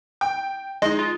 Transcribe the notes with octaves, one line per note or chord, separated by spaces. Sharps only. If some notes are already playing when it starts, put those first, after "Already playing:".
G5
G#3 D#4 D#5
F4